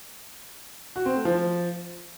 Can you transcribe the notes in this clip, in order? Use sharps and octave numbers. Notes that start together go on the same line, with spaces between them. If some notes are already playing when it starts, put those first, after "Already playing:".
F#4
C4
A3
F3